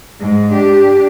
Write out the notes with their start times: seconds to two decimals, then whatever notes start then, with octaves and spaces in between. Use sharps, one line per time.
0.20 G#2 G#3
0.53 D4 G4